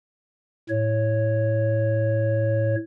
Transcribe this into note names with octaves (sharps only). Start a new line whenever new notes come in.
A2 C#5